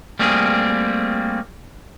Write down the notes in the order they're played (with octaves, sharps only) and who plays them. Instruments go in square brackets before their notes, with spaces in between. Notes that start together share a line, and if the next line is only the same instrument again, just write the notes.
[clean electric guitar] G3 A3 A#3 C4 G4 G#4